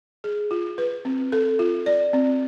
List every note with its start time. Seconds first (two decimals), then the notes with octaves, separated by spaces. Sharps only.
0.24 G#4
0.51 F4
0.78 B4
1.05 C4
1.32 A4
1.59 F4
1.86 D5
2.13 C4